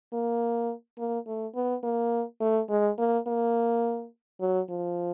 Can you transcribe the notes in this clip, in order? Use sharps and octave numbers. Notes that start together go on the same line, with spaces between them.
A#3
A#3
A3
B3
A#3
A3
G#3
A#3
A#3
F#3
F3